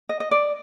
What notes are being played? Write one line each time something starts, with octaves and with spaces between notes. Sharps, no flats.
D#5
D#5
D5